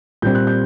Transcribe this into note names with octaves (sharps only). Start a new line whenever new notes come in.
A#2 G3 C4 G6
F#6
G6